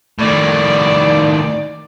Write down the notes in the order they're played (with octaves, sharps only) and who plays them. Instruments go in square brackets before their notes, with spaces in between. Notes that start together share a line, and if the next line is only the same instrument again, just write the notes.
[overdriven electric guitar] A2 D#3 [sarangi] D5